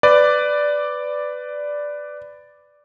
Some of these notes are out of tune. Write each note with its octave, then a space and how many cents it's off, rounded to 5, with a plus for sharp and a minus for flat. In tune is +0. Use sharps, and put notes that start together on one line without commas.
B4 +15 D5 +0